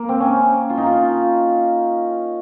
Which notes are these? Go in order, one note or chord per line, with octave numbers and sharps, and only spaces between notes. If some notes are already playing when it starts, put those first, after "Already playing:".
Already playing: A#3
C4
C#4
F4
D#4
F4